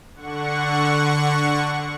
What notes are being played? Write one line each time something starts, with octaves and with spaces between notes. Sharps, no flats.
D3 F#5 C#6